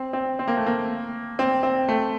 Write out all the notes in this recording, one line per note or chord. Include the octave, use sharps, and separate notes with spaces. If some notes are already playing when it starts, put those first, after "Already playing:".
Already playing: C4
C4
C4
A#3
A3
A#3
C4
C4
A3